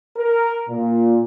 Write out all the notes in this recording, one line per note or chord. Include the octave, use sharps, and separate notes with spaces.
A#4
A#2